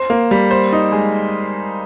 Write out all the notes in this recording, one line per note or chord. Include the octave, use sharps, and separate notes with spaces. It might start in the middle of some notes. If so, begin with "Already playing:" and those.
Already playing: C5
A#3
G3
C5
D#4
G#3